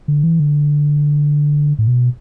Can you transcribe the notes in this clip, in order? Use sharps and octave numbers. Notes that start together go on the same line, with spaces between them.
D3
E3
D3
A2
B2